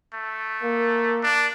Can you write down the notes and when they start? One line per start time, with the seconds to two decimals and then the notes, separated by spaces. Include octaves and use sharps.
0.14 A3
0.63 A#3
1.23 D4